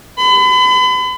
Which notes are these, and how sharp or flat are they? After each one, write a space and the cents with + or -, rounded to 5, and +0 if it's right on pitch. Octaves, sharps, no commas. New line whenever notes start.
B5 +40